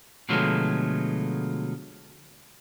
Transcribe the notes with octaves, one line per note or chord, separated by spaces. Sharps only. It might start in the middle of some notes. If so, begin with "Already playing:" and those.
B2 D3 F3 F#3 G#3 A3